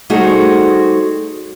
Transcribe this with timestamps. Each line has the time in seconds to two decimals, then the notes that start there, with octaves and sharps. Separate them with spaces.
0.10 G3 A3 D#4 F#4 G#4 C5